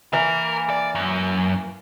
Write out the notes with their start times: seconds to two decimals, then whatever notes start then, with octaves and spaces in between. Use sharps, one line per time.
0.13 E3 A#3 A#4
0.70 D5
0.95 F#2